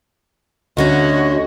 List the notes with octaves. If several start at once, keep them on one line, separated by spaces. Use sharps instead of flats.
D2 D3 C#4 F#4 D#5